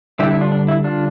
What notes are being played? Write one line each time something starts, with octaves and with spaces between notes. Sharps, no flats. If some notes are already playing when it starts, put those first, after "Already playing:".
D3 G3 D4 E4 G4
E4
D4 F4
D4
E4
D4 F4